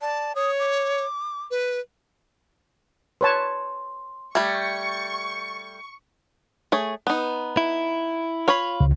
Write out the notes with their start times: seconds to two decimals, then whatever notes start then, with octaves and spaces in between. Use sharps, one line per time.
0.02 D5 A5
0.35 C#5 D#6
0.59 D6
1.51 B4
3.21 B4 C#5 A5 C6
4.35 G3 A3 C#6 G#6
6.72 A3 G#4 C#5
7.07 B3 D#4
7.57 E4
8.48 F4 C#5 F5 B5
8.81 C#2